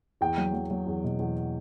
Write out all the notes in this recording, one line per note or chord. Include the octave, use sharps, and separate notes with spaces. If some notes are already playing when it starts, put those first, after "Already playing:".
E2 G5
F#3
F#3
F#3
E2
B2
E2